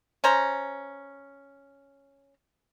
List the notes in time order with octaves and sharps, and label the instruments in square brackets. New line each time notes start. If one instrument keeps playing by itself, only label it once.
[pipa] C#4 C5 A#5